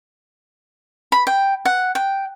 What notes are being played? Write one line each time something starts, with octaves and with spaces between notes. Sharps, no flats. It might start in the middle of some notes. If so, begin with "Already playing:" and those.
B5
G5
F#5
G5